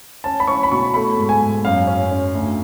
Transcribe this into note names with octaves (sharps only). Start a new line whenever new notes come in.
C#4 A5
B5
C#4 C#6
B5
B2 C#6
A3 B5
G#2
G#5
G#2
F#2 F5
C#4
C#4
D2